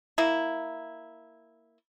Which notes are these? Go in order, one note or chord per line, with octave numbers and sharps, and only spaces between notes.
A#3 E4